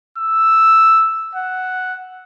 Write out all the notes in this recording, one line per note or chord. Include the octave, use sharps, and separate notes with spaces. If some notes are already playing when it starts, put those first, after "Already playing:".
E6
F#5